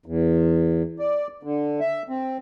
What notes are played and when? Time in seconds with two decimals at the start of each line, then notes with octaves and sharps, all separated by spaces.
0.06 E2
0.99 D5
1.43 D3
1.80 E5
2.09 C4